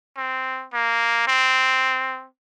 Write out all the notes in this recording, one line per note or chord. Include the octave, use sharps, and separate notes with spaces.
C4
A#3
C4